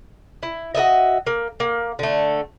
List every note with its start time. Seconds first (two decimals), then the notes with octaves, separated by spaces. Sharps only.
0.43 E4
0.75 F#4 A4 D#5 E5
1.27 A#3
1.60 A#3
1.99 D3 A3